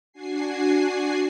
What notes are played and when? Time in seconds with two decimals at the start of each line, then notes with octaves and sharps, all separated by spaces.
0.13 D4 F#4 G#5 C7